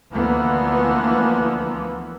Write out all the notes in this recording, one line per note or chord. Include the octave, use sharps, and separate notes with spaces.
D2 E3 F3 A#3 B3